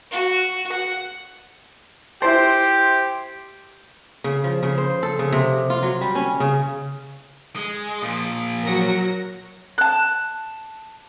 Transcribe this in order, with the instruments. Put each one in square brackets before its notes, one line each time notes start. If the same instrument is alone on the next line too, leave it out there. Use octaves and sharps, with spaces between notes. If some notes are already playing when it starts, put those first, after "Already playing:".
[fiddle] F#4
F#5
[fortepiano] E4 C5 [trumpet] G4
[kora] C#3
F3
C#3
C5
A4
C#3
C3
F4
F#3
G3
C#4
C#3
[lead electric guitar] G#3
A#2 F3
[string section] F#3 A#6 [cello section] F#4 A#4
[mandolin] A5 F#6